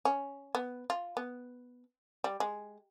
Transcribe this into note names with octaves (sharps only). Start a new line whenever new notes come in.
C#4
B3
F4
B3
G3
G#3